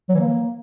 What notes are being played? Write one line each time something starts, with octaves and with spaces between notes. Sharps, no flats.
F#3
E3
A#3